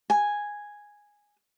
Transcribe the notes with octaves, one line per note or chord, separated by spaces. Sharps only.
G#5